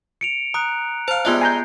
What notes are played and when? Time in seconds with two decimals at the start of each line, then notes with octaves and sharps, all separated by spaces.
0.21 C#7 D7 F7
0.54 A#5 D#6 F#6
1.08 C5 F5 A5
1.25 G3 G#3 B3 D4 F4 E5
1.41 G#5 A#5 G6 C7